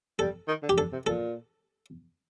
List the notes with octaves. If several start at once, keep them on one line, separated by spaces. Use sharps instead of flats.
G3 A4
D#3
D3
G4
D3 A4
C3
A#2 A4